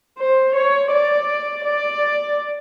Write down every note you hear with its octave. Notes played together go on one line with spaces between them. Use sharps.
C5
C#5
D5
D5